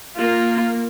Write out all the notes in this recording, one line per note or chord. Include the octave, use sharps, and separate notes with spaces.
A#3 F4